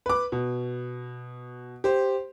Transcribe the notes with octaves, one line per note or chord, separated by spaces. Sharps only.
B4 D6
B2
G4 C5